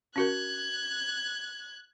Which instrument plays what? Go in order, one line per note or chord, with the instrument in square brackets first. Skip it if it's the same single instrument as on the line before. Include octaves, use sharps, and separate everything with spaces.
[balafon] C#4 F#4 A#4 [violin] F#6 G#6